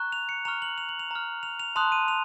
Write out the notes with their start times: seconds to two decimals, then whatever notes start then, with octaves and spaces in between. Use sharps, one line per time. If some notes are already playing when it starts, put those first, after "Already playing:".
Already playing: A#5 C#6 F#6
0.12 F7
0.29 C#7
0.45 A#5 C#6 F6 F7
0.62 F#7
0.78 F7
0.89 F#7
0.99 F7
1.11 A#5 F6
1.43 F7
1.60 F7
1.76 A5 C6 D#6 F#6 F7
1.92 D#7
2.08 F7